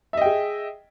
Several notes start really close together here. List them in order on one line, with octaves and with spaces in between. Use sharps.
E5 D#5 G5 G#4